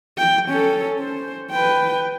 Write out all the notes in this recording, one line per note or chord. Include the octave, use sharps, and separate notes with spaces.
G5
C#4 A4
C5
B4 G5